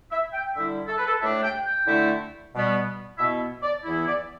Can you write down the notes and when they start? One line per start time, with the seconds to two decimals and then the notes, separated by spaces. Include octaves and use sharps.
0.11 E5
0.33 G5
0.55 D3 G3 E4 E5
0.88 A4
0.98 B4
1.07 A4
1.21 A2 A3 D4 E5
1.43 G5
1.66 G5
1.87 D3 A3 E4
2.53 B2 G3 B3
3.18 B2 B3 E4 E5
3.63 D5
3.85 E2 E3 B3 E4
4.07 D5